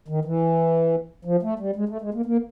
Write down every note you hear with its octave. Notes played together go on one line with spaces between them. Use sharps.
D#3
E3
F3
A3
G3
G#3
A3
G#3
A#3
A#3